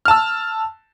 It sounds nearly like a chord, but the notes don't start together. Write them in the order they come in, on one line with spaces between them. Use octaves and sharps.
F6 A5 E6